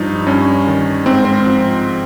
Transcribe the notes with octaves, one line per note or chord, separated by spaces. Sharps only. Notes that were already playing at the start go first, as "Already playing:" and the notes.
Already playing: G2 F3 D#4
G2 C#4
D#3
G#2 C4
C4
F3